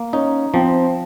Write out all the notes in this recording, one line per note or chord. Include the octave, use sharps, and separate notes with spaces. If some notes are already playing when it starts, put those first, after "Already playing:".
Already playing: A#3
C#4 D#4
F3 C4